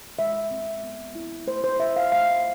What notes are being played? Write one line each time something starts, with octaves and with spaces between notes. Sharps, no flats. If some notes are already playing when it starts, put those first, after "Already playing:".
G#3 E5
C4
B3
E4
A3 C5
C5
E4 E5
F5
A3 F5